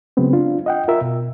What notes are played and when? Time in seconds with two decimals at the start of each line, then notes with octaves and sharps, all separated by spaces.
0.17 C#3 F#3 G#3 B3 C4
0.33 D4 F4
0.66 D#5 F#5 G5
0.88 F4 A#4 E5
1.01 B2